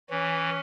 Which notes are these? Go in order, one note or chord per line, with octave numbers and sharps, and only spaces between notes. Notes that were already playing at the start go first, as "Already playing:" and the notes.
E3 C#4